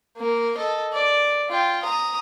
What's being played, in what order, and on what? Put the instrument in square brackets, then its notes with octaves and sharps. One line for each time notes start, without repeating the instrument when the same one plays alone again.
[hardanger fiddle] A#3 A#4
A4 D#5
D5
F4 G5
A#5 D#6